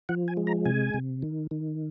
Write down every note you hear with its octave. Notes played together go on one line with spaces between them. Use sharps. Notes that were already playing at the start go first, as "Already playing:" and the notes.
F3 F#5
G#5
G#3
A#5
C3 G#5
C3
D#3
D#3